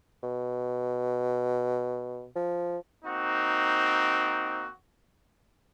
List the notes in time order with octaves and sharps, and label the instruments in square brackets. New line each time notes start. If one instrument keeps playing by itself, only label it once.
[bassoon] B2
F3
[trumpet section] A#3 C4 D#4 F#4